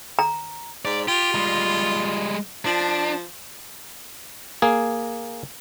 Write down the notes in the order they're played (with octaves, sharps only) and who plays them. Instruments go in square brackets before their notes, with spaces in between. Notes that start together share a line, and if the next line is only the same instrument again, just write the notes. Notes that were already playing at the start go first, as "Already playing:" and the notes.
[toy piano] A#5
[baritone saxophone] G#2 [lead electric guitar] D5
[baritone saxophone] F4 [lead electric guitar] G4
[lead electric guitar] G3 G#3
[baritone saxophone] F3 [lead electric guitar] D4
[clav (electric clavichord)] A#3 G#4